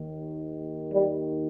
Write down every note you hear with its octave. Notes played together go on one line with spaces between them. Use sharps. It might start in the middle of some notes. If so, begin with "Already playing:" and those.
Already playing: D#2 D#3
G3